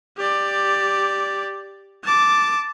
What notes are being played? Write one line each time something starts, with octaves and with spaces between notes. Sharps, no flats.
G4 D5
A5 D6